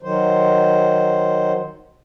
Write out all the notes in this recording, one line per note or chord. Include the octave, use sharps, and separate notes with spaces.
D#3 F#3 C5